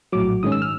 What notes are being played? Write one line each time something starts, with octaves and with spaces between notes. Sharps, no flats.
A#1 A2 F#3 D6
G#2 D#3 G#3 C#4 D#6
E6
F6